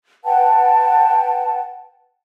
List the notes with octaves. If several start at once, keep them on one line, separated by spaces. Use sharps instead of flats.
B4 F#5 G5 A5